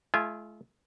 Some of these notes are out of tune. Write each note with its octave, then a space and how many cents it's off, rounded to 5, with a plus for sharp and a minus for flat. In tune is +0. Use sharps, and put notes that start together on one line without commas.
A3 -45 F4 -35 G#5 +0